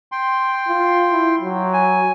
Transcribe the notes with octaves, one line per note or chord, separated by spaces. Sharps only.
G5 C6
F4
E4
F#3
G#5